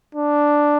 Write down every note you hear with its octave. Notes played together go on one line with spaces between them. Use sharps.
D4